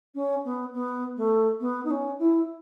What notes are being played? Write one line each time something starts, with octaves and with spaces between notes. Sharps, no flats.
C#4
B3
B3
A3
B3
D#4
C#4
E4